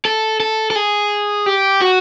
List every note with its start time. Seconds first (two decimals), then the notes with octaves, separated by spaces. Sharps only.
0.05 A4
0.40 A4
0.70 A4
0.76 G#4
1.46 G4
1.82 F#4